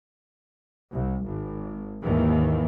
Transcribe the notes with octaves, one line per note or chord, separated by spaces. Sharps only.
C2
G#1
D#2 G#2 D#3 E3